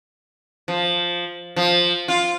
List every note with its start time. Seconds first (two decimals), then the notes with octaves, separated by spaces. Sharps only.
0.68 F3
1.56 F3
2.08 F4